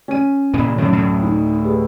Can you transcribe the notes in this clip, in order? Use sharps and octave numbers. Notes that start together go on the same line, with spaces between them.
C#4 D#7
A#2 C#3 E3
F#2 A2 D3 D#3
D2 A2
D#4
G4 G#4 B4